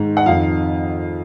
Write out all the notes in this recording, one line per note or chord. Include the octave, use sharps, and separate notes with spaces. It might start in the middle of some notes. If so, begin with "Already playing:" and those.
Already playing: G#2 D#3
F#5
F2 D#3 F5